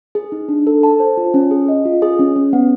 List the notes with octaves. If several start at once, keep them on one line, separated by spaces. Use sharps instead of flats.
G#4
D#4
D4
A4
A5
C5
F4
C#4
G#4
D#5
F4
G#4
C#4
C#4
B3